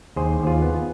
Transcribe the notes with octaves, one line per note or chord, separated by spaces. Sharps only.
D#2 G#4 C5
D#2
F4 G#4
B3